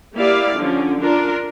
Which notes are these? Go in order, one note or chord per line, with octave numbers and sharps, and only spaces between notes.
A#3 E4 G4 D5 F5
D3 F3 C#4
D4 F4 A#4